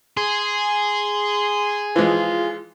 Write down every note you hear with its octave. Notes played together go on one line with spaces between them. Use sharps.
G#4 C6
E3 F3 G#3 F4